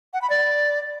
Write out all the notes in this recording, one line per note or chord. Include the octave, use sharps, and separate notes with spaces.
F#5
B5
D5